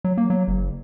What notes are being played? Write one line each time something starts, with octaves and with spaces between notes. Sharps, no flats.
F#3
A#3
F#3
F#1